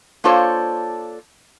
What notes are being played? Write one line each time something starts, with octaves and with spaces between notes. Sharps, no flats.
A#3 D4 F4 A4 C5 C#5